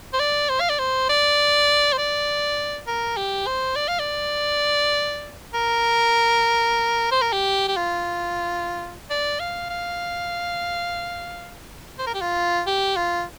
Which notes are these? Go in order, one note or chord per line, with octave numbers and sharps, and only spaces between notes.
C5
D5
C5
F5
D5
C5
D5
C5
D5
A#4
G4
C5
D5
F5
D5
A#4
C5
A#4
G4
G4
F4
D5
F5
F5
C5
A#4
G4
F4
G4
F4